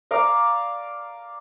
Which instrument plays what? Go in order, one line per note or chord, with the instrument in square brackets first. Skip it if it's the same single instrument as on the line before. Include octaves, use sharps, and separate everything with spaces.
[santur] D5 F5 A#5 D6